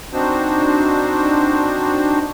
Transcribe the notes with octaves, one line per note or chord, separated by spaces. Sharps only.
C4 D4 D#4 F#4 C5